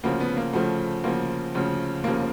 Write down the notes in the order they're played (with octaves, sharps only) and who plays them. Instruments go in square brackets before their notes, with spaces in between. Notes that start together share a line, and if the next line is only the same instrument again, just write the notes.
[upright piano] D2 C#3 F3 A#3
B3
A#3
D2 C#3 F3 A3
D2 C#3 F3 A#3
D2 C#3 F3
F1 D#2 C#3 F3 A#3